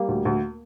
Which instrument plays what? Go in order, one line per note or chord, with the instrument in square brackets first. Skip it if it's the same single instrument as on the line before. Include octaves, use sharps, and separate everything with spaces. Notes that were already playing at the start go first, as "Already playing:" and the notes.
Already playing: [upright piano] G3 [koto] A#3
[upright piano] D2
D2